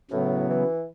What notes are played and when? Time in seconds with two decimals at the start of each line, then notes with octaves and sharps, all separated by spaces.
0.11 A2 C#3 F#3 B3
0.49 E3